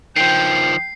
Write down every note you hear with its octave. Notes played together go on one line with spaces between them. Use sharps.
D#3 F3 G5 C7